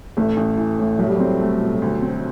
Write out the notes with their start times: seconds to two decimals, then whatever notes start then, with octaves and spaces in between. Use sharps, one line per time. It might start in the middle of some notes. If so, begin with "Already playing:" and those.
0.17 A1 A3
0.37 A1
0.57 E3
0.79 A2
0.99 C2 F#3
1.08 G3
1.17 F#3 C4
1.41 A3
1.61 B2
1.82 D2
2.02 C4